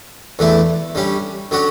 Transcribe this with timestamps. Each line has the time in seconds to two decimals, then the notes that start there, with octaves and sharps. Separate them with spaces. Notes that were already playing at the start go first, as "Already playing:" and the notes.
0.39 E2 D3 A3 E4
0.95 D3 G3 C#4
1.51 D3 F#3 C#4 F#4